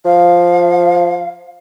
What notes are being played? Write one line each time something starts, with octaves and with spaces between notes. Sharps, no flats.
F3 F5